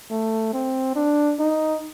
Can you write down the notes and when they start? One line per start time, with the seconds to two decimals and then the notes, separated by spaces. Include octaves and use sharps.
0.10 A3
0.53 C4
0.95 D4
1.39 D#4